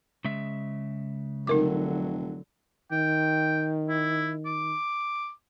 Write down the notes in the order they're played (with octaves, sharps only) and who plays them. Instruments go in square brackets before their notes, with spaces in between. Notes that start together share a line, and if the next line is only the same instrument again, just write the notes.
[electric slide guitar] C#3 G#3 E5
[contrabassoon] F1 [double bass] D3 F#3 [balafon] D#4 A#4 D6
[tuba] D#3 [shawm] G5
[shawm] E4
D6